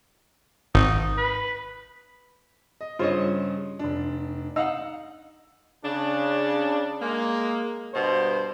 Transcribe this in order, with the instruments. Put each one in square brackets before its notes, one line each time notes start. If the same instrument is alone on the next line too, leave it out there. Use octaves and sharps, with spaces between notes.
[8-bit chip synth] G#1 [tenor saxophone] D#4
[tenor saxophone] B4
[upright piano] D#5
[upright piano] G2 C#3 C5 [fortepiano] F4 C#5 D#5
[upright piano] F1 D4
[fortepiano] D#4 F5 F#5 [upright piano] E6
[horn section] C#3 D4
G#3 A#3
G2 B2 C5